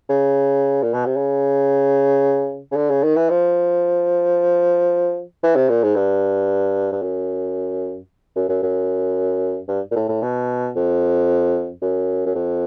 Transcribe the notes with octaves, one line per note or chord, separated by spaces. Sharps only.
C#3
A#2
B2
C3
C#3
C#3
D3
C#3
D#3
E3
F3
E3
C3
A#2
G#2
G2
G2
F#2
F#2
F#2
F#2
G2
A#2
A2
A2
B2
F2
F#2
F#2
F2